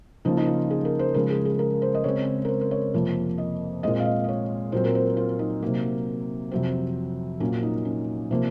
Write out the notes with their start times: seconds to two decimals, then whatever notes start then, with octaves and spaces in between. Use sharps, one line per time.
0.25 C#3 F3 A#3 D#4
0.37 D#4
0.48 F4
0.70 G#4
0.85 A#4
0.99 C5
1.14 C#3 F3 G#3 A#4
1.30 G#4
1.45 G#4
1.59 A#4
1.82 C5
1.94 D#5
2.04 C#3 G#3 C4 C#5
2.45 A#4
2.48 C5
2.61 C5
2.71 C#5
2.94 F2 C3 F3 A#3
3.38 D#5
3.83 A#2 G#3 C4 D#5
4.00 F5
4.05 D#5
4.24 D#5
4.29 C#5
4.72 A#2 F#3 C4 C5
4.85 A#4
4.95 C5
5.17 F4
5.39 D#4
5.63 C3 F#3 A#3
6.51 F2 C3 F#3 C4
7.40 A#2 F#3 A#3 C#4
7.63 D#4
7.85 C#4
8.31 C3 F3 A#3